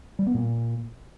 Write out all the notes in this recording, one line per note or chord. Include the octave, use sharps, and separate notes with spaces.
G3
B3
A#2